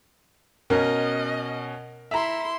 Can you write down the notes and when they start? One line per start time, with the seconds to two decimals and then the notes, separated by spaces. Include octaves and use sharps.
0.70 B2 C#4 A#4 D#5
2.11 E4 E5 A#5 C6